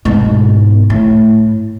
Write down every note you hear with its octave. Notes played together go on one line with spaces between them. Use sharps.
G#2 B2
A2